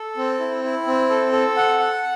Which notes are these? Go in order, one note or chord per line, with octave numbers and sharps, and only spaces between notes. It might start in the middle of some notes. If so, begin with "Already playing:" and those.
Already playing: A4
C4
E4
E4
C4
A4
A4
F#5
F#5